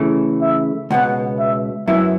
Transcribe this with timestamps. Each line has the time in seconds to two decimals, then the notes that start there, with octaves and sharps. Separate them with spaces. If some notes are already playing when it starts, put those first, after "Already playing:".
Already playing: C#3 E3 A3
0.41 E5
0.91 C#2 B2 B3 F#5
1.39 E5
1.88 F#2 F#3 B3 E4 E5